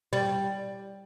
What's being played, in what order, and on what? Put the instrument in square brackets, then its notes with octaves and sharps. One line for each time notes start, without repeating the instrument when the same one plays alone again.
[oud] G3